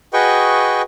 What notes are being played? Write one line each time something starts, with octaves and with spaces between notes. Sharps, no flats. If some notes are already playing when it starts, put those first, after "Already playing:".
F#4 G#4 B4 D#5 G5 C#6